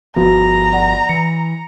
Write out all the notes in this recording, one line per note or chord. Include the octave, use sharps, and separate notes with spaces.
G1 F3 B3 F#4 A#5
D5 F#5
E3 C#7